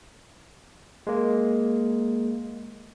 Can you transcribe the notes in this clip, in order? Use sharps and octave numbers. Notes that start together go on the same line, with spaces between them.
G#3 A#3